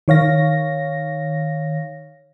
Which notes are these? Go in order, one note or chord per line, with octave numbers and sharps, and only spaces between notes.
D#3 C#5 F5 A#6